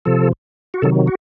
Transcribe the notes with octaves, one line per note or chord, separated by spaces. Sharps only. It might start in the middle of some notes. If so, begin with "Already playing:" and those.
C3 F3 A4
F#4
C3 D#3 F#3 A4
F#4